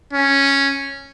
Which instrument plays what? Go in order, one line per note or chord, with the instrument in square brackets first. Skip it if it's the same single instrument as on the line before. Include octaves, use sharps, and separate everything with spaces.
[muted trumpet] C#4